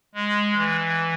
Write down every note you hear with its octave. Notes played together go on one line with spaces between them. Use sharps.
G#3
E3